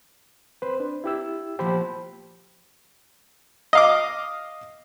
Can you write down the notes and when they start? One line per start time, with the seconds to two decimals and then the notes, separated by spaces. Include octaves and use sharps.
0.62 C4 B4 C5
0.80 D4
1.04 E4 G4 E6
1.59 A#2 F3 B3 G4 C5 B5
3.73 D#5 F5 D6